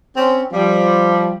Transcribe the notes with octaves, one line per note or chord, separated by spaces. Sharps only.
C4 C#4
F3 G3